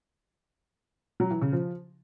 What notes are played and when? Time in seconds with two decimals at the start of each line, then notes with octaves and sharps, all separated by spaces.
1.20 F#3
1.31 E3
1.42 C#3
1.52 F3